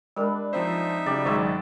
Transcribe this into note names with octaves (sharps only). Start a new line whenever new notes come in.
G3 G#3 D4 A#4 B4
F3 C4 D#4 C5 E5
C#3 F#3 G4 D5
G#1 G#2 F#3 G#4 D#5 E6